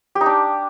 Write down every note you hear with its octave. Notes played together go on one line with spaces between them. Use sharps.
G4
D#4
D4